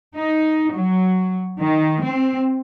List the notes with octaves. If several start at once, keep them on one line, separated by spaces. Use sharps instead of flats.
D#4
F#3
D#3
C4